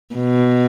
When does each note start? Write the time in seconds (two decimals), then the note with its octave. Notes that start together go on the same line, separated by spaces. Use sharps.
0.15 B2